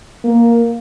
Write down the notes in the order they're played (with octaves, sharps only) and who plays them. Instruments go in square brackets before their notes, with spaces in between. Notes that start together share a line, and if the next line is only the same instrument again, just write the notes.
[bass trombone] A#3